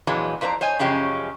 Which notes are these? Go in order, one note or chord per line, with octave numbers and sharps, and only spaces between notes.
F2 A#2 E3 F#3 G#3
F2 F3 C5 D5 A#5
C5 C#5 D#5 G#5
F#2 C#3 F3 G#3 C#4 G4